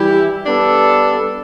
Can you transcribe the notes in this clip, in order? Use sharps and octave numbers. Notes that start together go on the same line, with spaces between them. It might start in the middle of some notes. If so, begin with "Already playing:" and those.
Already playing: E3 G3 E4 G4
G3 B3 D4 A4